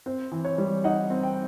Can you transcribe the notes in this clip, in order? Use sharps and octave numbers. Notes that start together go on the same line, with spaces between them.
C4 C5
E3
C#5
G3
D#4 F#5
C4
G5